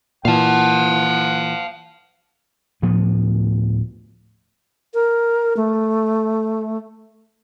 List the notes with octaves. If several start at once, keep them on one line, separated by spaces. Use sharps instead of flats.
A#2 E3 F5 F#5 A5
D2 A2 F3 B3
A#4
A3